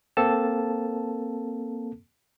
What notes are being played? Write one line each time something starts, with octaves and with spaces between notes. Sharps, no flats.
A#3 C4 A4 A5